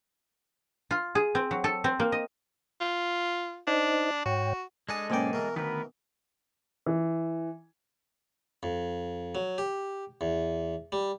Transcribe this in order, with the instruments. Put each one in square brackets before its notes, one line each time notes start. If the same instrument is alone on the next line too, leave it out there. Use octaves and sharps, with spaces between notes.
[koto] F4
G#4
C4
F#3
A4
C4
A#3
D#5
[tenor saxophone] F4
[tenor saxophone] D4 [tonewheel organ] D#4 C5 D#5
[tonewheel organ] G#2 C#5 G5 [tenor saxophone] F#4
[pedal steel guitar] G#3 A4 D#5 [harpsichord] D4 G#4 A5
[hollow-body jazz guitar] B1 A#3 G5 [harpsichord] G#2 D5 [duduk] C#4
[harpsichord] B2 E3 [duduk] A#4
[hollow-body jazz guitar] D2 D#3 [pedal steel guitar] B3 B4 [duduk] A#4
[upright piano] E3
[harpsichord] F2
F#3
G4
E2
G3